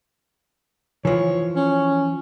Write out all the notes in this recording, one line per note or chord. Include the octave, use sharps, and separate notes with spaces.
E3 F3 C#5
C#4